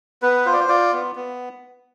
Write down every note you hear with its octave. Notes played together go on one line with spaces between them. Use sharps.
B3 B4
F4 C5
D5
C5
F4 D5
B3
B3